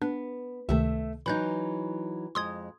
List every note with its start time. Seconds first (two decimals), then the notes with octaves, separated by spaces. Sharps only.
0.02 B3 D4
0.69 C#2 C3 D#3 A3 E5
1.26 E3 F#3 D#4 B5 F#6 G6
2.35 F2 G#3 C6 D#6 G#6